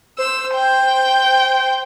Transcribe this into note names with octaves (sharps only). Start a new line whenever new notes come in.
C5 E6
G5